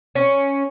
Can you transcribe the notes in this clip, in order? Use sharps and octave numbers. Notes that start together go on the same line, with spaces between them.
C#4